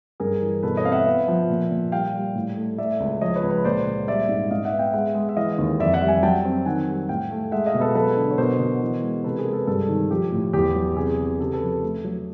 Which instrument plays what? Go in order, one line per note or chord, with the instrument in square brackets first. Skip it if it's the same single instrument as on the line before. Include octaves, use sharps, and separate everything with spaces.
[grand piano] G2 G#4 A#4
E3
B2 A4 B4
C#5 D#5
C4 F5
E5 F#5
B3
F3
A#2
A#2
G3 F5 G5
G3
A2
A3
A3 D5 E5
C#2
F3 C#5 D#5
B4 C#5
C#2
B4 C#5
A#2 C5 D5
A#2
G3 D5 E5
G#2
G#2 D#5 F5
E5 F#5
B3
F5 G5
G#3 E5 F#5
G#3
E5
E3 D#5 F5
D#2
F2 D5 E5
E5 F#5
G3
F#5 G#5
F#3 G5 A5
C4
D#3 F#5 G#5
G3
A2 F5 G5
A3
G#3 E5 F#5
D#5 F5
B2
A4 B4
F#3 A4 B4
D3
C#5
B2 A#4 C5
B2
E3
G#3
C3 A4 B4
G#4 A#4
G#3
A4 B4
G2 G4 A4
D#3
F3 G4
A2
E2 G4
F#3
C3 G#4
C3
C#3 G4 A4
A4 B4
F3
A3
F#3